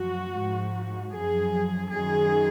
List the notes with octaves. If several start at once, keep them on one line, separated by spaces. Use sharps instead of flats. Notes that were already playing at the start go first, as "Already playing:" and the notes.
Already playing: F#2 F3 F#4
G#2 F3
F#2 F3 G#4
F#2 D#3 F#3 G#4